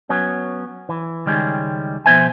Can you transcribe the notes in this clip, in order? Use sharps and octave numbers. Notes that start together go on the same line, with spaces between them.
F#3 B3 C#4
E3
C#2 D#3 G3 G#3 C#4
B2 F3 B3 C5 E5 G#5